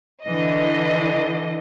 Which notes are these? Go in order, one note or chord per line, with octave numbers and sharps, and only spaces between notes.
D3 E3 D#5